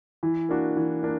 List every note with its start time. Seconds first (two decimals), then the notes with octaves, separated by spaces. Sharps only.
0.23 E3
0.49 A#3 D4 F#4
0.77 E3
1.03 A#3 D4